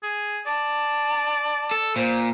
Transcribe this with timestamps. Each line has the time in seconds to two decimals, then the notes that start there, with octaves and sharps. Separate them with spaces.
0.03 G#4
0.46 D5 A5
1.71 A4
1.96 A#2 C5